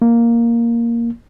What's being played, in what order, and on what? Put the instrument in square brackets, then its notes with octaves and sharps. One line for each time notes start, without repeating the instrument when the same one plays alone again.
[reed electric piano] A#3